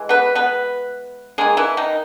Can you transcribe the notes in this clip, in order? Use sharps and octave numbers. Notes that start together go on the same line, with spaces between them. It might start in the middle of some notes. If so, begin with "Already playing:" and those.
Already playing: E3 G#3
B3 B4
B3 B4
D#3 G#3 A#3 G#4
E3 E4
D#3 D#4